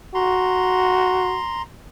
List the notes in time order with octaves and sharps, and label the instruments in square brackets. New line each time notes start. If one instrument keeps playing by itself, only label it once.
[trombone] F#4 [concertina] A#5 C6